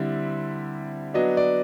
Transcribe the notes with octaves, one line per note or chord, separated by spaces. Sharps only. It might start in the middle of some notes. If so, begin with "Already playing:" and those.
Already playing: D3 G3 C4 E4 E5
F#3 B3 D4 D#5
D5